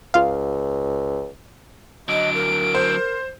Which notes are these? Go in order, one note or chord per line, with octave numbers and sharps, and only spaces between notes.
C#2 F4 F5
D3 F#3 D#5 D7
A#4
C5